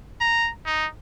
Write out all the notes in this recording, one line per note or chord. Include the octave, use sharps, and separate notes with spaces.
A#5
D#4